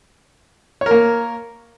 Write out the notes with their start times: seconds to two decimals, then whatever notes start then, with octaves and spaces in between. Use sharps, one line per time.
0.81 C#5
0.86 A#4
0.91 A#3